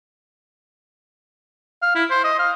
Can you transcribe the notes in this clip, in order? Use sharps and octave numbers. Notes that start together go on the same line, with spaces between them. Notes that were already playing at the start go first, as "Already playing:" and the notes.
F5
E4
C5
D#5
F5